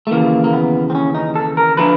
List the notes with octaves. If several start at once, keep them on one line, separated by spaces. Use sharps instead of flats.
A3
D#2 C#3 E3 A#3
A#3
B3
C4
C#4
D#4
A4
A#4
D3 F3 B4